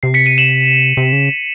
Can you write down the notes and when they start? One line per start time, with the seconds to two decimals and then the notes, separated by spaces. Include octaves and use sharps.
0.03 C3 C7
0.14 B6 C#7
0.26 C#7 D#7
0.38 E7 F#7
0.97 C3
1.13 C#3